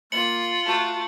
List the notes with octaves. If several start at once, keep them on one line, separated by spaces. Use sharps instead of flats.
A#3 F4 C#7 F#7
A3 F#4